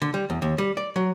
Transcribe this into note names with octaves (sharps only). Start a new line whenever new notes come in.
D3
G3
E2
D#2
G3
D5
F#3